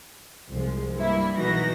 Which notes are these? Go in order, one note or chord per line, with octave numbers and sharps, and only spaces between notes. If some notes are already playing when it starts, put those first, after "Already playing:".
C2 F3 G#3
G2 A#3 E4
B1 E3 D#4 F#4 A#6